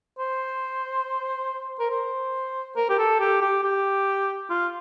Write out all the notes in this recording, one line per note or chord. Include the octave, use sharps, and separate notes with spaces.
C5
A#4
C5
A#4
G4
A4
G4
G4
G4
F4